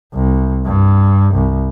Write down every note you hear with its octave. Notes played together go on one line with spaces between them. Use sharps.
C2
G2
C2